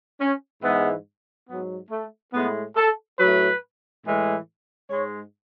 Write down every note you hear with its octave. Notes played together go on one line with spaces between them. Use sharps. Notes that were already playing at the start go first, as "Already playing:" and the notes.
C#4
G#2 E3 G#3 B3
G#2 F#3 B3
A3
A2 G#3 B3
A4
A2 F#3 B4
A2 E3 G#3
G#2 G#3 C#5